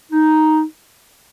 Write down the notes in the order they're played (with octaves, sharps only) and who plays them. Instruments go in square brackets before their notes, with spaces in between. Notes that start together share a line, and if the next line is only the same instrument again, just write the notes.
[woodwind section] D#4